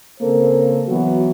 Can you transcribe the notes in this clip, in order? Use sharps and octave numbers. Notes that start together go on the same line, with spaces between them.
C#3 A#3 C4 A4 A#4 C5
E3 F#3 B3 F#4